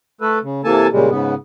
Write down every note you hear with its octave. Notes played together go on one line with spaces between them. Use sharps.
A3 A4 B4
C#3
C3 E3 A#3 A4 G#5 A5
A#2 C#3 G3 G#3
G#2 C#3 B3